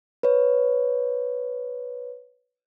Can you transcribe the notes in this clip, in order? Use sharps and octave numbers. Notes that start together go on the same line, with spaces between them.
B4 C#5